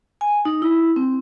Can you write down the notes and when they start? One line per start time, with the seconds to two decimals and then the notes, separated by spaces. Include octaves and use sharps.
0.21 G#5
0.45 D#4
0.62 E4
0.96 C4